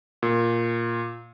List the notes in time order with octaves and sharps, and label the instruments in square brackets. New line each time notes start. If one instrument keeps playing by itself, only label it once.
[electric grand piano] A#2